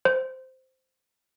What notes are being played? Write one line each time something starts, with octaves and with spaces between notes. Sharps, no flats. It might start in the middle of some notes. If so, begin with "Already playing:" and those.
C5